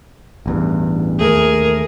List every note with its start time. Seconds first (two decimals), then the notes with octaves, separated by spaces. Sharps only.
0.46 A1 E2 G2
1.20 D#2 A3 G#4 A#4